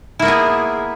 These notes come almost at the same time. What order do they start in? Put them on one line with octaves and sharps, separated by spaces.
E4 A#3 B3 G#4